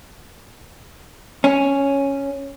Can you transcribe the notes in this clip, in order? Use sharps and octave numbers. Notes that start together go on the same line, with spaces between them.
C#4